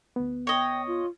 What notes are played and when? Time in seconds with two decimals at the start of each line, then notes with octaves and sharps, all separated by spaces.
0.16 D2 B3
0.47 C#5 D#5 G5
0.87 F4